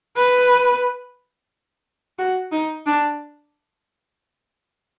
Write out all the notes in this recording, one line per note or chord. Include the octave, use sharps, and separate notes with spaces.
B4
F#4
D#4
D4